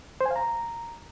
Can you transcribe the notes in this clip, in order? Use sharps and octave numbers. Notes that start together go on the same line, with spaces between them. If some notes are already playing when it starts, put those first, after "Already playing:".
C5
G#5
F5
A#5